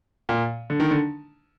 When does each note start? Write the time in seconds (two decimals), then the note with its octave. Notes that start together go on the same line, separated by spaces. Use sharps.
0.29 A#2
0.70 D3
0.80 D#3
0.91 D3